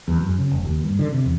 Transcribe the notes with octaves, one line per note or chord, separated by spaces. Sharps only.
E2
F#2
C#3
F1
D#2
G2
D3
C3
E2